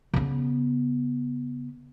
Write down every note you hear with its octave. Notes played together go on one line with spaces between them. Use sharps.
C#3 B3